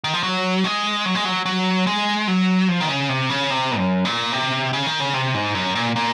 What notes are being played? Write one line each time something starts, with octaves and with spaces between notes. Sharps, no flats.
D#3
F3
F#3
G#3
F#3
G#3
F#3
F#3
G#3
F#3
F3
D#3
C#3
C3
C#3
C3
F#2
A#2
C3
C#3
D#3
C#3
C3
G#2
F#2
A#2
A#2